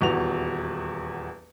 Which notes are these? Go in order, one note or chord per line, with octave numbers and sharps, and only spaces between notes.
D#1 E2 F#4 F7